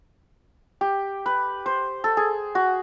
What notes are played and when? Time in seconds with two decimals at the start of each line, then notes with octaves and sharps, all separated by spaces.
0.81 G4
1.26 B4
1.66 C5
2.04 A4
2.17 G#4
2.55 F#4